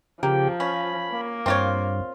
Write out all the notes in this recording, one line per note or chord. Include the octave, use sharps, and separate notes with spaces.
C#3 F3 A#3 G4 G5
C#4 B5
A#3
G2 C4 F4 C#5